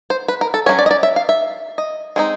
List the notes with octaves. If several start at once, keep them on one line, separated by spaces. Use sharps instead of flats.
C5
B4
A#4
A4
F#3 A#3 C#4 C#5
D5
D#5
D5
E5
F5
E5
D#5
G#3 C4 D#4